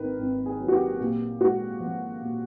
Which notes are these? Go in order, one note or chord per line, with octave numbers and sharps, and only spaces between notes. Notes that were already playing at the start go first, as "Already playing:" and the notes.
Already playing: G#1 D#3 A#4 B4
G#1
G#4
F#3
F#4
G4
A#2 G4
G#3 F#4
F3
A#2